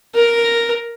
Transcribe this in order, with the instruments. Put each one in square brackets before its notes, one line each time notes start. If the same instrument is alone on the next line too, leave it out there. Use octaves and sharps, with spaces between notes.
[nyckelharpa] A#4